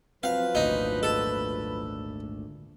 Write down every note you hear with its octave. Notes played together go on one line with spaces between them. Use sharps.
F3 F#3 C4 B4 F5
G#1 D2 A#2 D#4
A4